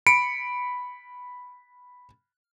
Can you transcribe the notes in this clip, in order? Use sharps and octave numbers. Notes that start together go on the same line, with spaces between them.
B5 C#7 D7